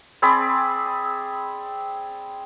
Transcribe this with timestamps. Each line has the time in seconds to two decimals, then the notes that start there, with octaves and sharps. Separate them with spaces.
0.22 C4 G#4 D5 B5